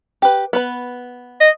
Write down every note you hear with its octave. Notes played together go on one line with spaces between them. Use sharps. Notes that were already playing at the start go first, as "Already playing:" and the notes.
G4 B4
B3 B4 B5
D#5